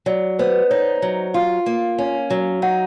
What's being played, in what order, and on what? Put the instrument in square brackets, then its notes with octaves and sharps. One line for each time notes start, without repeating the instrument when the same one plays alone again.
[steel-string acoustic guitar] F#3 [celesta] D5
[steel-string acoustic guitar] B3 [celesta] C5
[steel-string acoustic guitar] D#4 [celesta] C#5
[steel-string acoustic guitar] F#3
[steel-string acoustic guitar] F4 [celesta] F5
[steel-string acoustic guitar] A#3
C#4
F#3
[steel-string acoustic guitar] D#4 [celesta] F#5